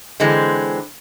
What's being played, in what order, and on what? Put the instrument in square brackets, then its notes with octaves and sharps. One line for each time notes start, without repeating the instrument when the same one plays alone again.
[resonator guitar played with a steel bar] D3 E3 G#3 C4